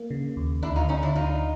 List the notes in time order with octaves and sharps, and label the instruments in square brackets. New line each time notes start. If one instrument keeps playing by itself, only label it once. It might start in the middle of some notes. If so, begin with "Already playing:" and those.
Already playing: [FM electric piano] A#3
C#3
D#2
[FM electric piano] D2 [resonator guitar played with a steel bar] D4 E4
[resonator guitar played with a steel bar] D#4 F4
[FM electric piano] D3 [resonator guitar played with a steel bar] C#4 D#4
[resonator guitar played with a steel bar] D4 E4
[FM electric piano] D2 [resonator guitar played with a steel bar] D#4 F4